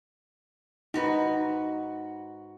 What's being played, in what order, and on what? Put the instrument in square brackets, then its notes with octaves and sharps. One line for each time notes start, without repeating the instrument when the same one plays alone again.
[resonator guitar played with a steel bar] G#2 F#4 B4 [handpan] D#4